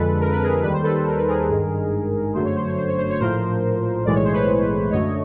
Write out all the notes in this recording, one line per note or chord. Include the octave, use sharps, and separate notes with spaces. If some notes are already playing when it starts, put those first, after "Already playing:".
Already playing: F2 D3 F3 G#3 A4 B4
A#4
B4
G#4 A#4
D#2 D#3 G3 B4
C5
A4 B4
A#4
B4
G#4 A#4
G#1 G2 D#3 G#3
G1 F#2 D3 F#3 A3 C5
C#5
C5
C#5
C5
C#5
C5
C#5
A#1 A2 F3 A#4 C5
B1 A2 E3 G#3 D5
C#5
C5
B4 C#5
F#2 D3 F#3 A3 C#5 D#5